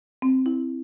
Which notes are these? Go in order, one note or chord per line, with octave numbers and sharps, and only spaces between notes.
C4
E4